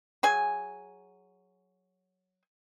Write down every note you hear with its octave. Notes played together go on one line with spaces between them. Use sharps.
F#3 G#4 G#5